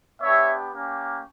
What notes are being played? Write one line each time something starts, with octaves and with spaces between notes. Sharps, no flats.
B3 D4 G4 C#5 E5
A#3 C#4 G4